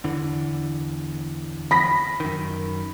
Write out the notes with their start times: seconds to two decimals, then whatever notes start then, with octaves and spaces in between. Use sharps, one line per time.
0.04 E2 D3 E3
1.71 B5 A#6 B6
2.20 F#2 D#3